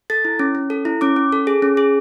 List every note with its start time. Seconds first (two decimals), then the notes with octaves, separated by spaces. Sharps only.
0.10 A4 A6
0.25 E4
0.39 C#4
0.55 C#4
0.70 A4
0.85 E4
1.01 C#4 D6
1.16 C#4
1.32 A4
1.47 G#4
1.62 C#4
1.77 G#4